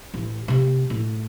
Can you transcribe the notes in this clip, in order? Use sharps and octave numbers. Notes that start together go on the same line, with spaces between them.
A1
C3 A#3
A2